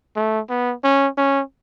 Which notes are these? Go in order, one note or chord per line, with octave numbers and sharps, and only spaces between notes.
A3
B3
C#4
C#4